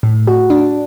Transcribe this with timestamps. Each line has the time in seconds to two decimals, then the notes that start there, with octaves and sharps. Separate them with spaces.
0.03 A2
0.27 F#4
0.50 D4